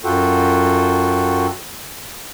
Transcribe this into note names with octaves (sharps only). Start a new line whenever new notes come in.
F#2 F4 F#4 A4 G5